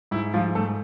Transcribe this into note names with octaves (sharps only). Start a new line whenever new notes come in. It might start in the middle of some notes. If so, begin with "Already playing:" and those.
G#2 E4
G#2 F3 F4
G#2 A3 A4